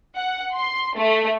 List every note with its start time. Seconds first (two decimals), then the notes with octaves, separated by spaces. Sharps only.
0.16 F#5
0.53 C6
0.96 A3